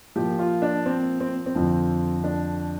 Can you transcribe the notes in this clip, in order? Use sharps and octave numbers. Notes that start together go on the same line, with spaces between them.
A#2 F3 G4
F4
D4
C4
C4
C4
F2 D3 F3
D4